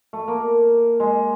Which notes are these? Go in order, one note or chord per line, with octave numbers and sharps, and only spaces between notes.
A3
A#3
G#3